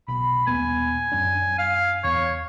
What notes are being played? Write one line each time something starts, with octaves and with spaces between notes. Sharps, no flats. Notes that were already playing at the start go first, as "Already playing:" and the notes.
B1 B5
D#1 B3 G#5
F#2 C#4 D4
F5
E2 C#5